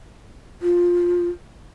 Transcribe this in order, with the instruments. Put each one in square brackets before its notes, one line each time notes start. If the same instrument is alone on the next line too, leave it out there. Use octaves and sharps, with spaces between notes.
[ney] F4